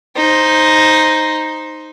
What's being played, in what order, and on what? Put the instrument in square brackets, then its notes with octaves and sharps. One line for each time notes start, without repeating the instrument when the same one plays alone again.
[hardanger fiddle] D#4 C5